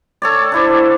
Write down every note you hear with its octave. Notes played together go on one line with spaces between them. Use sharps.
A4 C#5 D5
D4 E4 C5